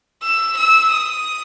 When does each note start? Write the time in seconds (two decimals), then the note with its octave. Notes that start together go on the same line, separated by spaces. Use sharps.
0.23 E6
0.57 E6
0.92 D#6